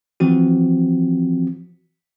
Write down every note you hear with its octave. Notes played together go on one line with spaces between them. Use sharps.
E3 F3 C4 F#4